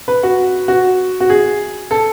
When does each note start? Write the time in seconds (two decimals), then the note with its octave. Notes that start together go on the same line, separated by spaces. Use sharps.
0.08 B4
0.23 F#4
0.68 F#4
1.20 F#4
1.30 G#4
1.91 A4